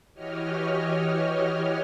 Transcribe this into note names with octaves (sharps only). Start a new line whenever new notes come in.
E3 F#4 G4 C#5 D#5 F6